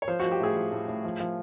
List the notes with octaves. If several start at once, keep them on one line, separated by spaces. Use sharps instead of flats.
C#5
F3 C5
F#4
F3
G4
A2 G#4
F3
A2
A2
F3
F3